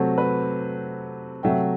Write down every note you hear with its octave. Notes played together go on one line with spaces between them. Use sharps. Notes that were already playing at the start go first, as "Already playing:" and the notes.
Already playing: C3 F#3 A3 A4 C5
B4
C3 F#3 A3 E5 G5